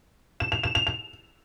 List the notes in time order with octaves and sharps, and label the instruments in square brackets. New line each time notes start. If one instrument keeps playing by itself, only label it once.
[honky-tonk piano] E7
F7
E7
F7
F7